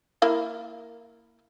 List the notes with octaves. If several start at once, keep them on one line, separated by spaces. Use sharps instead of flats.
A#3 E4 F5